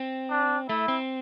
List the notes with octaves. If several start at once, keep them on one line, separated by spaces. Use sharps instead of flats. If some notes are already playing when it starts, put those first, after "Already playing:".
Already playing: C4
D4
A3 E4
C4